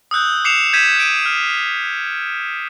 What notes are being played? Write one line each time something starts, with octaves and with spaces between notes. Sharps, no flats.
D#6 E6 F#6 G6
D6 C7 C#7 E7 F7
G6 G#6 B6 D#7 E7
F#6 D7 D#7
F6